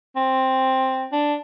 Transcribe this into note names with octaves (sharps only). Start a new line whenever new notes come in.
C4
D4